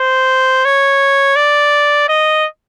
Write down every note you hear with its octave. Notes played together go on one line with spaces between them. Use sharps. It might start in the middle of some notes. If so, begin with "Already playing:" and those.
Already playing: C5
C#5
D5
D#5